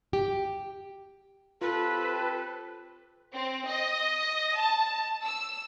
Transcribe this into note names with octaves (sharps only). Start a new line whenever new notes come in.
G4
C4 F4 G4 A4 B4
C4
D#5
A5
E6